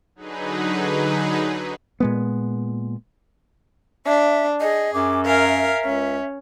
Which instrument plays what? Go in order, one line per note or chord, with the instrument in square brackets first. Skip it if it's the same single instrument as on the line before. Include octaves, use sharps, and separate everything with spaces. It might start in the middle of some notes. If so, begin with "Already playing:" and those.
[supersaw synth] D3 F#3 D#4 G#4 B4
[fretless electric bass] A#2 G#3 B3
[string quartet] D4 [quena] E5
[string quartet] G#4 [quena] D#5
[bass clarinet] F#2 [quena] D6
[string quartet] A#4 F5 G#5 [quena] E5
[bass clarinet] C#2 [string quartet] C#4